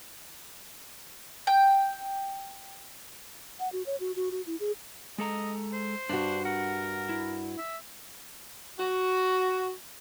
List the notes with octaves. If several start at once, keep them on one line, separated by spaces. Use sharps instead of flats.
G5
F#5
F#4
C#5
F#4
F#4
F#4
E4
G#4
G#3 A4 D#5 A#5
C5
G2 D4 F#4
A#4 F#5
E4
E5
F#4